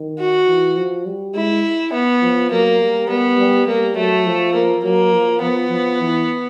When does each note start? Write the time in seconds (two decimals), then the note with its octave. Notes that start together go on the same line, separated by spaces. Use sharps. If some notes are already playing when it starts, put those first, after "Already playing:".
Already playing: D#3
0.19 F#4
0.47 E3
0.77 F3
1.06 G3
1.34 G#3 E4
1.93 B3
2.22 F3
2.51 F#3 A#3
2.80 G3
3.09 G3 B3
3.38 G3
3.67 G3 A#3
3.96 F#3 A3
4.25 F3
4.54 A#3
4.83 F#3 A#3
5.12 F3
5.41 F3 B3
5.70 F3
6.00 E3